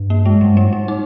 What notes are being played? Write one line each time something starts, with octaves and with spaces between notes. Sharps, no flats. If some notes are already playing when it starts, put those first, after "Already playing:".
Already playing: G2
A#3
G#3
G2 G3
G3
G#2
G3
D#4